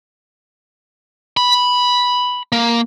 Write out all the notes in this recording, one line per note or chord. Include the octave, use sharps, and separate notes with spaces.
B5
A#3